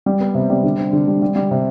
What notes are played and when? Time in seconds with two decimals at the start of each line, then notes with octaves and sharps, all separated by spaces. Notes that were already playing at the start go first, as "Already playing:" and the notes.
0.06 G3
0.20 B3
0.35 C3
0.50 G3
0.64 D3
0.78 C4
0.93 D3
1.08 G3
1.22 G3
1.36 G3
1.51 C3